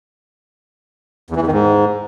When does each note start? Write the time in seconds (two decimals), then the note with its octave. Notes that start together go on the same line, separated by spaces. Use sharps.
1.30 E2
1.36 E3
1.41 E2
1.47 D#3
1.52 G#2